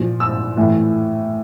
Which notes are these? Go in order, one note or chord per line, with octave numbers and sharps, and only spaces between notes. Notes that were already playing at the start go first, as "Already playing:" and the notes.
Already playing: A#2 F3
E6
A2 E3